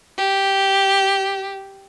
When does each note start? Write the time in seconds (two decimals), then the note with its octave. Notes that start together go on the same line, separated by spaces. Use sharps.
0.18 G4